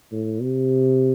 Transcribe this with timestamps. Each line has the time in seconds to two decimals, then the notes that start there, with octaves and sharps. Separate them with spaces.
0.12 A2
0.42 C3